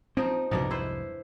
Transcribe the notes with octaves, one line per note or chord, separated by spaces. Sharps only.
F3 C4 D#4
C2 F2 G#2 B2 D4 D#4
E4 B4 C5